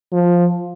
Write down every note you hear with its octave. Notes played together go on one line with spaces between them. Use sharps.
F3